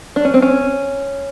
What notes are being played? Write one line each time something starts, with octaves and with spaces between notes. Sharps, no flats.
D4
C#4
C4
C#4